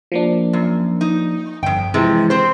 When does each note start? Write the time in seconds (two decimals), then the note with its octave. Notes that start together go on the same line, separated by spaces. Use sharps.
0.12 F3 A#3 D4
0.53 F#2
1.01 D#4
1.63 G1 F2 G5
1.94 C3 E3 F3 G#3
2.30 C4 C5